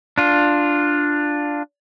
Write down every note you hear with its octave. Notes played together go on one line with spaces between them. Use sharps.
D4 F4